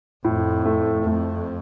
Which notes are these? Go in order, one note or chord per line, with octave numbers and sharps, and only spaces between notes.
F2 A2
A3
F2 A3